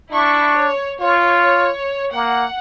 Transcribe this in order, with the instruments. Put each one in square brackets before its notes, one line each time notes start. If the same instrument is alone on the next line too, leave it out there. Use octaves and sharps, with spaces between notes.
[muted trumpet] D4 [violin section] E4 C#6
[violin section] C#5
[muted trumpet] F4 [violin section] C#5
[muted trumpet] A#3 [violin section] F#5